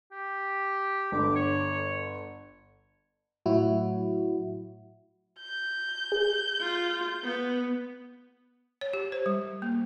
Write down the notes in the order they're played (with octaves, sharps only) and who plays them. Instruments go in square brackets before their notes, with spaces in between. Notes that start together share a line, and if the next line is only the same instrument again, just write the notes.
[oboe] G4
[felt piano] G1 D3 [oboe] D6
[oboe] C#5
[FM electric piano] A2 F#3 E4 F#4
[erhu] G6
[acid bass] G#4
[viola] F4
B3
[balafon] C#5
G4
C5
G3
A#3